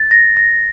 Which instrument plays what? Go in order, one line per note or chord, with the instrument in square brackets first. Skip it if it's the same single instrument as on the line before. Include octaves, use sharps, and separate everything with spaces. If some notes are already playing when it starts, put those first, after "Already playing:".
Already playing: [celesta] A6
A#6
A#6